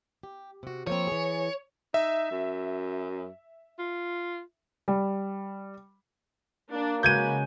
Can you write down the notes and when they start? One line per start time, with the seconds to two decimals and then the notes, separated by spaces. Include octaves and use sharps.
0.23 G4
0.63 C3 F#4
0.87 F3 A#3 C4 C#5
1.07 E3 G#4
1.94 D#4 E5
2.31 F#2
3.79 F4
4.88 G3
6.72 A#3 D4
7.03 C#3 G#3 F#4 B4 G6 G#6 D#7